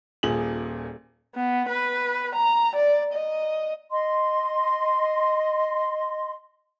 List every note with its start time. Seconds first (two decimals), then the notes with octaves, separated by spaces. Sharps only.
0.23 D#1 A#2 G#4 F#7
1.36 B3
1.70 B4
2.36 A#5
2.76 D5
3.13 D#5
3.91 D#5 C6